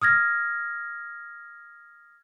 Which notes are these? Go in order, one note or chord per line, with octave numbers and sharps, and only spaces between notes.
D#6 F6 G#6 A#6